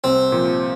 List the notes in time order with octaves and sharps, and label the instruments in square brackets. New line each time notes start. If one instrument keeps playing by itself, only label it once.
[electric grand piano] C2 [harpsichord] C4
[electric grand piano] A#2 F3